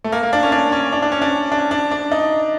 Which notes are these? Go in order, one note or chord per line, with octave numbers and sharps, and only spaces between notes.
A3
A#3
A#3
D4
C#4
D4
C#4
D4
D4
C#4
D4
D4
D4
D4
D#4